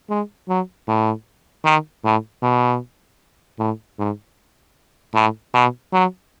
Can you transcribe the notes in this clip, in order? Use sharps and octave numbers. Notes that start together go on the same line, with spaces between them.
G#3
F#3
A2
D#3
A2
B2
A2
G#2
A2
B2
F#3